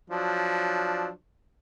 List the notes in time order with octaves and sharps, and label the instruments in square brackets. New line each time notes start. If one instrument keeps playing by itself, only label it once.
[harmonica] F3 F#3 D4